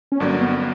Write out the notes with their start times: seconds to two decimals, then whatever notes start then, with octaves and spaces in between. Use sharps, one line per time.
0.12 C#4
0.20 G1 G2 D3 F#3 A#3 D4
0.41 B3